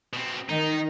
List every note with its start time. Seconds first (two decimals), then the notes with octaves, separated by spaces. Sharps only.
0.14 B2 C4
0.49 D#3 D#4